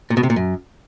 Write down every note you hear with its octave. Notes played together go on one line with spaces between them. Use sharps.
A#2
B2
C3
A#2
F#2